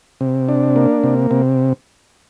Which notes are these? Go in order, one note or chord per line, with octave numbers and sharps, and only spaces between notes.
C3
D4
A#3
C3
C3